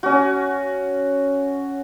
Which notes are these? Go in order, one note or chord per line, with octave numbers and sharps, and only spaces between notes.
C#4 F#4